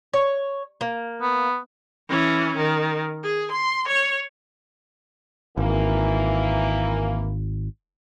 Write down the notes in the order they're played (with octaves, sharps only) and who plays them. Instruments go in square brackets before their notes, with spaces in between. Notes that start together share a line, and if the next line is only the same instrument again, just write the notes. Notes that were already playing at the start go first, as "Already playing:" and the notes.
[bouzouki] C#5
A#3
[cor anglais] B3
[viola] E3 C#4
D#3
G#4
C6
C#5
[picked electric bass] G#1 [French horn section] E3 A#3